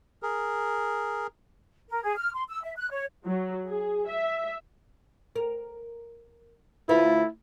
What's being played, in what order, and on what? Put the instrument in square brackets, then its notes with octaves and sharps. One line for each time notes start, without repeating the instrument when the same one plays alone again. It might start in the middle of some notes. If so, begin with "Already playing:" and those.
[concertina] G#4 A#4
[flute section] A#4
G#4
F6
C6
E6
E5
F#6
C#5
[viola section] F#3
G#4
E5
[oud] A#4
[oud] D2 F4 B4 [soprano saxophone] E4